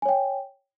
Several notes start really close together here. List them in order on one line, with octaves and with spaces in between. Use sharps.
G#5 C#5 G5